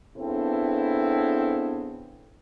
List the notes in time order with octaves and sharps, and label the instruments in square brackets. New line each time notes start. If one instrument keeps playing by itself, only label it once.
[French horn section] C#3 B3 C4 D4 E4 A4